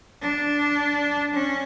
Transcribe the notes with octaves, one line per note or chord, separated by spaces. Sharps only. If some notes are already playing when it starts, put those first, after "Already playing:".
D4
C#4